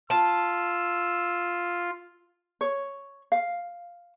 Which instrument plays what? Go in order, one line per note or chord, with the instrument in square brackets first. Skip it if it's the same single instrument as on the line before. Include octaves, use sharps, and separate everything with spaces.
[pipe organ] F4 [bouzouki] A5 [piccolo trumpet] E6
[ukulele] C#5
F5